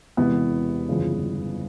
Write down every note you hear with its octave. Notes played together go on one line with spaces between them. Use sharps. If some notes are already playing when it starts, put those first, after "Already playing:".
E1 E2 C3 E3 B3
G1 F2 C#3 E3